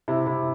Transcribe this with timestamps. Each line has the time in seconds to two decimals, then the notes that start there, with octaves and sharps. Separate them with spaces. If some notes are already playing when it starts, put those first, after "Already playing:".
0.08 C3 E4
0.26 C3 E4